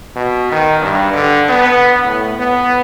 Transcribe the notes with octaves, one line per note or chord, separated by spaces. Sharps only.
B2
D#3
G2
D3
B3
A2
B3